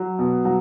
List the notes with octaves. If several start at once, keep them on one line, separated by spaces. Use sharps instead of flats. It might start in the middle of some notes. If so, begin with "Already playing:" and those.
Already playing: F#3
B2
F#3